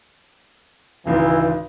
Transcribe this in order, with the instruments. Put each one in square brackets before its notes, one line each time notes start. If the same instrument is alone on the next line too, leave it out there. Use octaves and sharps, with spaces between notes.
[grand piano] G#1 C#2 G#2 [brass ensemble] E3